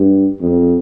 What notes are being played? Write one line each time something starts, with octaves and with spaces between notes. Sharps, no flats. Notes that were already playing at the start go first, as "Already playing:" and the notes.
Already playing: G2
F2